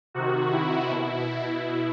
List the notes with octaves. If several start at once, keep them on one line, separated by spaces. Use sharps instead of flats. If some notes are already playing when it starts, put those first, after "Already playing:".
C3 D#3 F#4
E4
B2